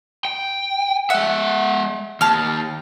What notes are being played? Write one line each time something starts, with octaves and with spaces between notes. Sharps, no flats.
G5
G#3 E5 F#5
D#2 A5 F6